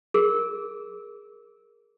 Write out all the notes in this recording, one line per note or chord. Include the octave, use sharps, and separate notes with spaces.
G#4 A#4